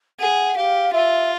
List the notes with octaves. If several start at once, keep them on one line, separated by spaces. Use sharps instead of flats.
G#4 F#5
G4 F5
F4 E5